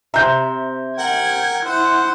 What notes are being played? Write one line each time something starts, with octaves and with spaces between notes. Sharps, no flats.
C3 E5 A#5 G6
A#4 F#5 G5 G#6
E4 C5 F#5